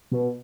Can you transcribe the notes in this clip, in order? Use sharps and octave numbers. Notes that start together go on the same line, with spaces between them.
B2